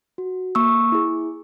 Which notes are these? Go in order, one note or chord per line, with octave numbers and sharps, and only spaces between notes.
F#4
A#3 C#6 E6
E4 G#4